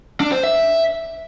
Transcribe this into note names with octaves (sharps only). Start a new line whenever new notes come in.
D4
C5
E5